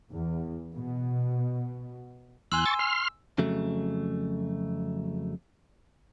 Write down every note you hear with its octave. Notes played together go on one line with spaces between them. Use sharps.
E2
B2
E2 G#5 C6 E6 F#6
C#6 E6 A6
C6 F6
F2 C#3 F#3 A3